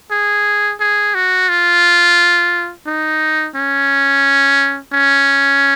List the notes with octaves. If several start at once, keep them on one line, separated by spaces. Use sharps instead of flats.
G#4
G#4
F#4
F4
D#4
C#4
C#4